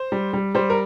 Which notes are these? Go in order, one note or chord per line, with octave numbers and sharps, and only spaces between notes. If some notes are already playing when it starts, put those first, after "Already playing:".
Already playing: C5
G3
G3
G3 C5
A#4